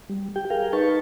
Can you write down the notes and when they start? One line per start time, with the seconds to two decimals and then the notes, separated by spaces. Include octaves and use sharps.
0.09 G3
0.36 G4 G5
0.50 G#4 A#4 F5 G5
0.73 D#4 B4 A5 C#6